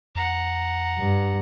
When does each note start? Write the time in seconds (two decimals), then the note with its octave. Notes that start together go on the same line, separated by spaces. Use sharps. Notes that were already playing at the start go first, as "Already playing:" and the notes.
0.15 F2 F#5 A#5
0.99 G2